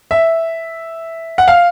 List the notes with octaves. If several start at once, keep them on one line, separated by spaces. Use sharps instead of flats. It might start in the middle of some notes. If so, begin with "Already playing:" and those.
E5
F#5
F5